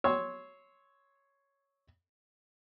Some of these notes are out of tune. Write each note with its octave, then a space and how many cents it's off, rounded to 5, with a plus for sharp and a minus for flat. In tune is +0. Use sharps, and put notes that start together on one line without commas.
C#5 +0 C6 +0 E6 -20